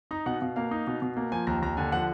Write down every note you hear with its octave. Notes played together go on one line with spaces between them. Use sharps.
D#4 A#5
B2 F#5
B2 F5
A#3 F5
D#4
B2
B2
A#3
F3 G#5
D#2 A#5
D#2 A#5
D3 G#5
F3 F#5